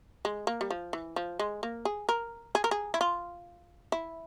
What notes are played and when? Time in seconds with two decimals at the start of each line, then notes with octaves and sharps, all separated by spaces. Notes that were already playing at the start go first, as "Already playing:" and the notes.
0.25 G#3
0.47 A#3
0.61 G3
0.71 F3
0.93 E3
1.16 F3
1.39 G#3
1.63 A#3
1.85 G#4
2.09 A#4
2.55 G#4
2.64 A#4
2.71 G#4
2.94 E4
3.01 F4
3.92 E4